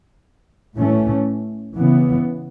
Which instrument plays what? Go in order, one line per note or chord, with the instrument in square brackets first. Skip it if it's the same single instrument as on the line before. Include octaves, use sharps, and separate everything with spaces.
[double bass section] A2 E3 A3 C#4
C#3 E3 B3